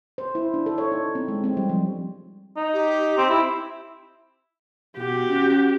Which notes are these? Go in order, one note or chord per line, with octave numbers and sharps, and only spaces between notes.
C5
E4
D4
A4
C#5
D#4
C4
G#3
C4
G3
F3
D#4
G4
C4
E4
B2 F#4 G4
C#4